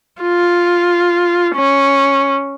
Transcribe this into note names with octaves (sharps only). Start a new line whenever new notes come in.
F4
C#4